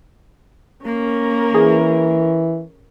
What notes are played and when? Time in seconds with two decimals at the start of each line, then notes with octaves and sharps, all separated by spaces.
0.85 A#3 C#4 A#4
1.54 E3 G#4